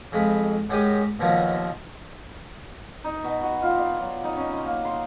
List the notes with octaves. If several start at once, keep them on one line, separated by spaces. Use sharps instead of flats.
F2 G#3 B5
F#2 F#3 G#3 G4 D#6
D#2 B2 F3 F#3
D#4
B2
F#4
F4
D5
F#3
D#4
C#4
C6
A#3
C6